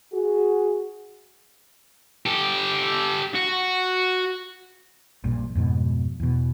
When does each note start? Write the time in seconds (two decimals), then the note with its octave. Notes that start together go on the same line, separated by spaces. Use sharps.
0.12 F#4 G#4
2.26 G4 A4
3.34 F#4
5.24 A#1 G2 A#2
5.55 F2 G#2 B2
6.20 E2 B2